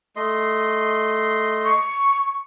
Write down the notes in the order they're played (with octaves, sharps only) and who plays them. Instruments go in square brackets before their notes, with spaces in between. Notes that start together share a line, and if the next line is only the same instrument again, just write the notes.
[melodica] A3 D#5 C6
[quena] C#6